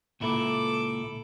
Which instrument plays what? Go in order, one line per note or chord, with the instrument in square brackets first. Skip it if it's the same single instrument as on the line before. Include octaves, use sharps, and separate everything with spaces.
[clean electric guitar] C#2 A#2 E4 [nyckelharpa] A4 D6